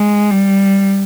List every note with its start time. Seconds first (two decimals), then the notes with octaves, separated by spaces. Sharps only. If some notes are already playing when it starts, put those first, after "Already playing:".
Already playing: G#3
0.30 G3